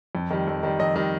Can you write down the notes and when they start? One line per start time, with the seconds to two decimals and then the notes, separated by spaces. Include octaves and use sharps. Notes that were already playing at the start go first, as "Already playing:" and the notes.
0.15 F2
0.30 D#3 G3
0.48 F2
0.63 D#3 G3
0.79 F2 D#5
0.96 D#3 G3